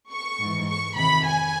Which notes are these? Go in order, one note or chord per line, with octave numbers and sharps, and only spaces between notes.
C#6
G#2 E3
C#6
F2 C3 D#3 B5
G#5